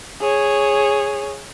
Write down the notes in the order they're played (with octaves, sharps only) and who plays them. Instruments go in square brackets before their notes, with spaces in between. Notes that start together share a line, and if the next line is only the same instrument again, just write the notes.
[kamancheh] G#4 C#5